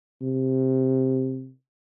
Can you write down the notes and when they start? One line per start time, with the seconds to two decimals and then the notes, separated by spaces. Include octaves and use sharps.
0.21 C3